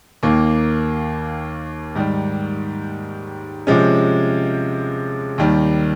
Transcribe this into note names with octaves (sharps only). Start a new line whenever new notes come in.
D#2 D#3 A#3
G#2 D#3 G3
C3 F3 G#3 C#4
D#2 D#3 G3